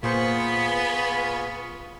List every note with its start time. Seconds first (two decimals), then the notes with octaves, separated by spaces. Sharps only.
0.03 A#2 B3 F4 G#4 C5 B5 C#6 C#7